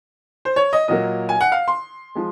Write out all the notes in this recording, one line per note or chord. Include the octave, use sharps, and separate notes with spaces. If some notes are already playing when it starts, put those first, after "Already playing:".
C5
C#5
D#5
A#2 F#3 A#3 D#5
G#5
F#5
F5
C6
F3 G#3